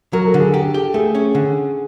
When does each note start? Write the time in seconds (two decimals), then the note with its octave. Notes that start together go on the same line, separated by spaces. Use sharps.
0.13 F#3 A#4
0.26 A4
0.34 D3
0.39 G#4
0.52 G4 A4
0.74 G4
0.94 A3 G#4
1.15 C#4
1.35 D3